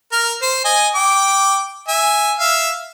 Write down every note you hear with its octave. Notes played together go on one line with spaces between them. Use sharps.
A#4 F6
C5
D#5 G#5
G5 D6
E5 G#5
E5 F5